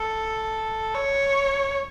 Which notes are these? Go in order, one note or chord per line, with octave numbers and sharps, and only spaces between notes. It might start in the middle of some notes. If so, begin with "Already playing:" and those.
Already playing: A4
C#5